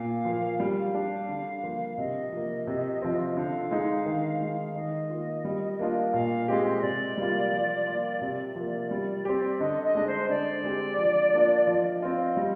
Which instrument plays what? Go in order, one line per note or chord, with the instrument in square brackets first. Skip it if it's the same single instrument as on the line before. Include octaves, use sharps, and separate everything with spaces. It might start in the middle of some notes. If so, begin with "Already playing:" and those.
Already playing: [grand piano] A#2 [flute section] F5
[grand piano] F3 A#3
[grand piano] G3 [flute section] F5
[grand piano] D4 G4
D3
F3 A#3 F4
[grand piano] C3 [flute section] D#5
[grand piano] F3 A#3
C3
F3 C4
[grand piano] D3 [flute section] F5
[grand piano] G#3 D#4
D#3
G#3 D#4
[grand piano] D#3 [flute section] D#5
[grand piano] A#3 F4
G3
A#3 D4 F4
[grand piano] A#2 [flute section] F5
[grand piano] G#3 C4 G4 [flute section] D#5
[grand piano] C3 [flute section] D5
[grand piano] G3 A#3 F4
F3
A#3 F4
[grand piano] C3 [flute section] D5
[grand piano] F3 A#3
G3
C4 G4
[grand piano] D3 [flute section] D#5
[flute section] D#5
[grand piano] G#3 D4
[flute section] C5
[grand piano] D3 [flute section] D5
[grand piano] G#3 C4 G4
F3
A#3 D4 F4
[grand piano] F3 [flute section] D#5
[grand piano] C4 F4
G3